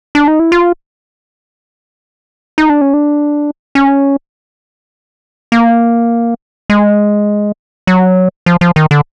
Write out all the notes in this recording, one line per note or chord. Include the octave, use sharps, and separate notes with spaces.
D4
D#4
E4
F4
D#4
D4
C#4
D4
C#4
A#3
G#3
F#3
F3
F3
D#3
D3